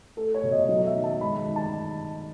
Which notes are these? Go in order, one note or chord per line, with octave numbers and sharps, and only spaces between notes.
A3 A4
C#5
B2
D#5
F#3 D#5
E5
D#3
A5
G#3 B5
D#3
A5